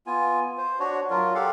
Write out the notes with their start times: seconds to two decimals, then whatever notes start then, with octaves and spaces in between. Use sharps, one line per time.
0.07 B3 F4 G#5
0.58 C5
0.80 D4 F#4 C#5
1.10 F#3 F4 A#4
1.35 G4 A4 F5 F#5